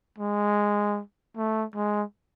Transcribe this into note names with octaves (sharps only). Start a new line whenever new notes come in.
G#3
A3
G#3